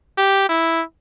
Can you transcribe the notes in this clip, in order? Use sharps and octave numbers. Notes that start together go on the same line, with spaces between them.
G4
E4